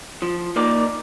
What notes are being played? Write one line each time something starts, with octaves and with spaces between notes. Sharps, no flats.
F3
A#3 D#4 A#4 D5